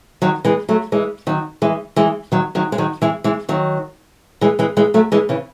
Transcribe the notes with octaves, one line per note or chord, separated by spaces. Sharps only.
D#3 F#3
E3 G#3
F#3 A3
E3 G#3
D#3 F#3
E3 G#3
E3 G#3
D#3 F#3
D#3 F#3
G#3
D#3 F#3
E3 G#3
E3 G#3
D#3 F#3
E3 G#3
E3 G#3
E3 G#3
F#3 A3
E3 G#3
C#3 E3